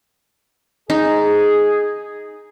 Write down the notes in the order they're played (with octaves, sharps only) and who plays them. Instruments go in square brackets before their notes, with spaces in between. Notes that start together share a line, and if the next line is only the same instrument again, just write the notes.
[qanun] D#4 [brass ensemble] G#4